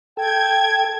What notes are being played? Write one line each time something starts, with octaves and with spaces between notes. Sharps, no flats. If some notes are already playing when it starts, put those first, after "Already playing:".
A4 G5 G#6